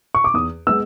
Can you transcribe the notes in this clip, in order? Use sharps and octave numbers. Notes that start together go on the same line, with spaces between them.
C#6
D6
E2 D#6
G#3 B3 E6